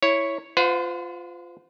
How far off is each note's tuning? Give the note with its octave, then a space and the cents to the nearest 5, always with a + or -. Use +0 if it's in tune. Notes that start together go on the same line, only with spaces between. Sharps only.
E4 +0 C#5 +0
F4 +0 C5 -40 F#5 -30